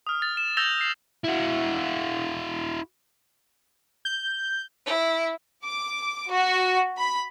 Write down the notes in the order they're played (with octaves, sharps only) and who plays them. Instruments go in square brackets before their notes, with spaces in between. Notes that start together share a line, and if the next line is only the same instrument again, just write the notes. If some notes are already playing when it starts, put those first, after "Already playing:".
[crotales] D#6 F6
A6
E7
E6 G6 A6 A#6 F7 G7
C7
[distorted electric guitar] E4 F#4
[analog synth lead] G6
[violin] E4
[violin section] D6
F#4
B5